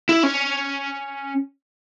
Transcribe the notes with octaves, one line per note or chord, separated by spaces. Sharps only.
E4
C#4